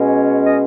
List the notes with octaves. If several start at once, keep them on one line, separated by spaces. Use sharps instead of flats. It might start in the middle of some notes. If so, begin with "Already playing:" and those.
Already playing: B2 G#3 C#4
D#5